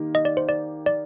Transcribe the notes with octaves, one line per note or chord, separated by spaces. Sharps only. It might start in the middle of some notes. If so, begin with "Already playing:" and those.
Already playing: D#3 A#3 D#4 G4
D#5
D5
C5
D5
D5